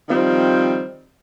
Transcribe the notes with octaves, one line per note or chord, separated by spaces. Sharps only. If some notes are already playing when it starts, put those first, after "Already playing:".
D#3 F3 G3 C4